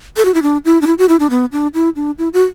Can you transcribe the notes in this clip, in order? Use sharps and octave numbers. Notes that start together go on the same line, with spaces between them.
A4
F#4
E4
D4
E4
D4
E4
F#4
E4
D4
B3
D4
E4
D4
E4
F#4